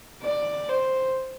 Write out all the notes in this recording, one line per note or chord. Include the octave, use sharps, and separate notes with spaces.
D5
C5